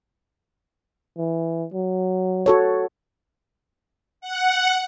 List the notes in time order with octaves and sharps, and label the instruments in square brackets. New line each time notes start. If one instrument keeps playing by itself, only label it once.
[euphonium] E3
F#3
[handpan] F#4 A4 C#5
[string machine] F#5